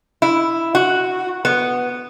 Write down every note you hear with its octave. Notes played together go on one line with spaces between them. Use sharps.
E4
F#4
B3